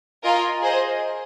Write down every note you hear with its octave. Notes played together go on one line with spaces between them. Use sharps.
F4 A#4 D#5 G#5
G#4 C5 D#5